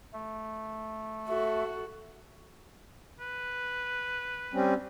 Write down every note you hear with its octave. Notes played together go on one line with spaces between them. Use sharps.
A3
F#4 A4 E5
B4
G3 C4 C#4